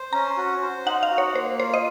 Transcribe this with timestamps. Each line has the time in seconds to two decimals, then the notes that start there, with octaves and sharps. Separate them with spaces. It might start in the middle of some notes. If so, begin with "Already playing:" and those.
Already playing: C5
0.13 C#4 A#5
0.37 F#4
0.62 C5
0.86 D#4 F#5
1.03 F5
1.10 F#4
1.18 C#5
1.35 A#3 C5
1.59 F4 C5
1.74 D#5